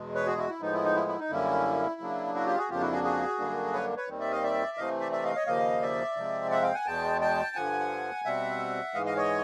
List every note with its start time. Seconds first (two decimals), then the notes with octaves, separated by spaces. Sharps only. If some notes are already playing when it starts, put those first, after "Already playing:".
Already playing: E2 B2 G#3
0.15 B4 C#5
0.27 F#4 G#4
0.37 E4 F#4
0.49 E4
0.61 A2 F3 G#3 B3 D#4
0.73 E4
0.84 D#4
0.95 E4
1.08 E4
1.19 D#4
1.30 F#2 D3 G3 A#3 C#4 E4
2.01 C#3 F#3 A#3 D4
2.35 E4 F#4
2.46 F4 G4
2.57 F#4 G#4
2.70 F2 C#3 F3 A#3 D4 F4 G4
2.81 E4 F#4
2.92 F#4 G#4
3.04 F#4 G#4
3.39 F#2 D3 G3 A#3 D4
3.73 B4 C#5
3.97 B4 C#5
4.08 D#2 D#3 G3 C4
4.20 D5 E5
4.31 D#5 F5
4.43 D5 E5
4.77 C3 E3 A3 C4 D#5 F5
5.00 D5 E5
5.12 D5 E5
5.24 D#5 F5
5.35 C#5 D#5
5.47 D#2 C#3 F3 A#3 D#5 F5
5.82 D5 E5
6.17 C3 F3 G#3 C4
6.51 E5 F#5
6.62 F5 G5
6.74 F#5 G#5
6.86 E2 B2 G#3 G5 A5
7.21 G5 A5
7.55 G2 D3 F3 F#5 G#5
8.25 B2 G3 C4 E5 F#5
8.94 G#2 E3 G#3 D#5 F5
9.06 D#5 F5
9.17 C#5 D#5